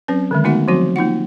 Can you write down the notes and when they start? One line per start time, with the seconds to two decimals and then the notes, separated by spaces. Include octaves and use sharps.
0.08 F#3 C4 C#4 B4
0.31 D3 D#3 G#3
0.44 A3 B3 D#4 F#4 E5 F#5
0.68 F3 F#3 C4 F#4
0.96 A#3 D#4 F4 F#5